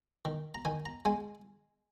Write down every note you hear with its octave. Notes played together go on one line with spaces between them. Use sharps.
D#3
A#5
D#3 G#5
A#5
G#3 G#5